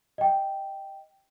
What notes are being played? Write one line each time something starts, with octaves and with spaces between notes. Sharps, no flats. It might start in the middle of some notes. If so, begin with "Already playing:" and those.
D#5 G5